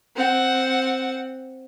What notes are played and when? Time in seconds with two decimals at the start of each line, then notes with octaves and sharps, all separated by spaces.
0.16 C4 F#5